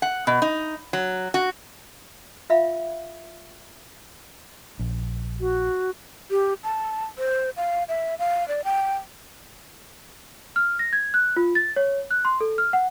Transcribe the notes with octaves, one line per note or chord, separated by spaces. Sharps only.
F#5
B2
D#4
F#3
F#4
F4 E5 F5 B5
A#1
F#4
G4
A5
C5
F5
E5
F5
D5
G5
F6
A#6
G#6
F#6
F4
A6
C#5
F#6
C6
A4
F6
F#5